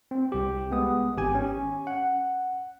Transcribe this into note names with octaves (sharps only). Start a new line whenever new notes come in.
C4
C2 G4
G#3 B3 D#6
G#1 G4 G#5
C#4
F#5